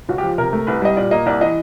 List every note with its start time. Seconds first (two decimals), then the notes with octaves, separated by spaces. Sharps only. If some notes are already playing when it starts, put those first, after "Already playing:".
0.09 C#2 F#4
0.18 G4
0.24 F3
0.38 C3 A#4
0.53 A3
0.67 C2 B4
0.82 G3 D#5
0.97 A#2 D5
1.11 A#3 D#5
1.26 C2 D5
1.41 E3 D#5